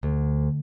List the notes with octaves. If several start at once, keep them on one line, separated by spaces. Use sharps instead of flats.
D2